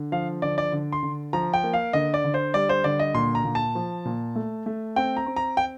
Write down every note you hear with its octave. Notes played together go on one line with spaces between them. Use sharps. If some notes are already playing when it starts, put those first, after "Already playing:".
Already playing: D3
F3 F5
D3 D5
D5
D3
C6
D3
F3 A#5
G5
A#3
F5
D3 D#5
D5
D3
C5
G3 D5
C5
D3 D5
D#5
A#2 C6
A#5
A#2
A5
F3
A#2
A3
A3
C4 G5
A#5
C4
A#5
G5